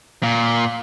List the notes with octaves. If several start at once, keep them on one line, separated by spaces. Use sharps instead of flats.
A#2